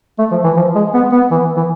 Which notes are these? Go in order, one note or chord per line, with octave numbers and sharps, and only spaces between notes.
A3
F3
E3
F3
G#3
B3
B3
E3
E3